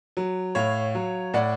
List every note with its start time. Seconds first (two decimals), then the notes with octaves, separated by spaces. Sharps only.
0.17 F#3
0.55 A2 C#5 F5
0.95 F#3
1.34 A2 D5 F#5